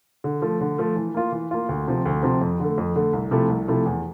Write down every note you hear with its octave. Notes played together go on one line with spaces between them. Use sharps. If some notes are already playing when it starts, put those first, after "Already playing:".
D3
F3 A3
D3
F3 A3
E3
A#3 F4
E3
A#3 F4
D2
C3 F3 C4
D2
C3 F3 C4
F2
D3 A3
F2
D3 A3
C2
C3 F3 A3 E4
C2
C3 F3 A3 E4
E2